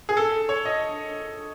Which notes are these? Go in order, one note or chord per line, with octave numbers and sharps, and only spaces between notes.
G#4
A4
C#5
D#5